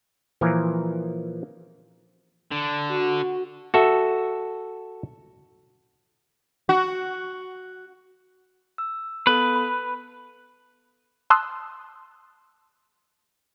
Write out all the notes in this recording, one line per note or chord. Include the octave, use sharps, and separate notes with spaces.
A#2 E3 F3 A#4 G#5
D3
F#4
F#4 A4 E5
F#4
E6
B3 A4 B4
B5
A5 C6 D#6 E6 F#6